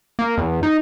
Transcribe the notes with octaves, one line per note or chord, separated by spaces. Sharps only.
A#3
E2
D#4